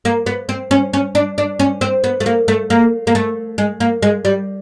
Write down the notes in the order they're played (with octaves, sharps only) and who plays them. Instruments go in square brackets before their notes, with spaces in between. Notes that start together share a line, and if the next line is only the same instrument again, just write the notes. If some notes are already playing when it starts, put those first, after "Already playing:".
[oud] A#3
B3
C4
C#4
C#4
D4
D4
C#4
C4
B3
A3
A#3
A3
A#3
A#3
A3
G#3
A#3
G#3
G3